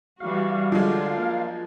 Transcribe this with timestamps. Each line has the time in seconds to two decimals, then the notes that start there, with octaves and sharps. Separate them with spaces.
0.20 E3 G3 F#4 F5
0.72 D3 F3 F#3 G#3 D4 F4
1.17 A#3